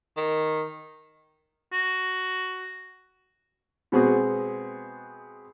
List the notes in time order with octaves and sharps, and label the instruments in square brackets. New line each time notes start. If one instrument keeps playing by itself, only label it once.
[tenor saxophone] D#3
[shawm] F#4
[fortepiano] B2 G#3 B3 C4 F#4 G#4